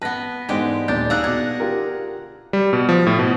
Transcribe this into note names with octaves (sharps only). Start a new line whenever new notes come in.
B3 B4 A5 A#6
E2 G#2 D3 G#3 G4
D#1 D4 G6 A6
G#4 F5 F#5 A#5 E6 F#6
B2 F#5 D6 G#6
F4 G4 A#4
G3
B2
F3
A2
B2